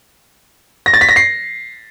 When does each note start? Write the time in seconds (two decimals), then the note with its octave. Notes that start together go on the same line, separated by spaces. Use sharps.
0.86 A#6
0.94 A6
1.01 B6
1.09 A#6
1.16 C7